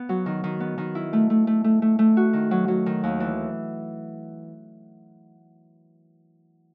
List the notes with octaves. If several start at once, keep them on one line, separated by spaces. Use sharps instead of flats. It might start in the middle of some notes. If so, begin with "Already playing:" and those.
Already playing: B3
F#3
D#3
D#3
B3
D#3
E4
A3
A3
A3
A3
A3
A3
F#4
D#3
F#3
F#3
D#3
D#2
E3